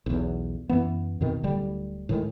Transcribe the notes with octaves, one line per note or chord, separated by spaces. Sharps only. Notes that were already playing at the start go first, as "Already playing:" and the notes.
B1 E2
F#2 E3 B3
F2 B2 D#3
D1 D3 G3
A2 D#3 G#3